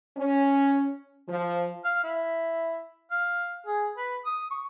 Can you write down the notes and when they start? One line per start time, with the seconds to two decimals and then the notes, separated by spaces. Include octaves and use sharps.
0.17 C#4
1.29 F3
1.84 F5
2.03 E4
3.11 F5
3.66 G#4
3.97 B4
4.25 D#6
4.50 C#6